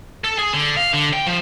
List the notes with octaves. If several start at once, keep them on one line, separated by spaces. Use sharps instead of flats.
A4
G#4
D3
F5
D3
G5
F3